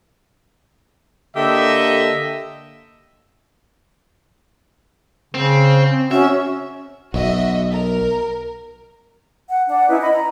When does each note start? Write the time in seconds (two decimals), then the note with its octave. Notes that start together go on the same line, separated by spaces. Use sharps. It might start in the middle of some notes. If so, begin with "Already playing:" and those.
1.36 D3 A#3 G4 A4 D#5 E5
5.35 C#3 C4
5.91 C4
6.11 C#4 F#4 E5
7.14 B1 F#4 D#5 E5
7.72 A#4
9.48 F#5
9.69 D4 F#5
9.89 C#4 D#4 E4 B4
10.00 E4 D#5 B5
10.13 A#5